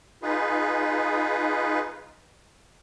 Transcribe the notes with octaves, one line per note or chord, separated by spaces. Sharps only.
D#4 F4 G#4 B4